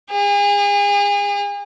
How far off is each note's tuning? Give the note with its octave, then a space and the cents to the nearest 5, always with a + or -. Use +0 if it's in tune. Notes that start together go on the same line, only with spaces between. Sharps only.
G#4 -35